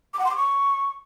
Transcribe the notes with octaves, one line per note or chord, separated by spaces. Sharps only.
D6
F#5
C6
D6
C#6